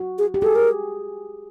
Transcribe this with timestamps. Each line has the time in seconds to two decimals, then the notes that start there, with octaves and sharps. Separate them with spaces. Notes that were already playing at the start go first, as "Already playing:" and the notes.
Already playing: F#4
0.18 G#4
0.34 G4
0.42 G#4 A4
0.56 A#4